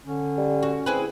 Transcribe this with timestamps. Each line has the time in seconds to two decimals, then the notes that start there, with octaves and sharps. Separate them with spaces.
0.04 D3 C#4
0.38 G3
0.63 F#4
0.86 C4 E4 G#4 B4